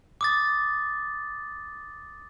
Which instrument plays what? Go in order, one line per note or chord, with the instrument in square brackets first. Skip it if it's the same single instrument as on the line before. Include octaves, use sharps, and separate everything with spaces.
[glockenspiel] D6 D#6 A6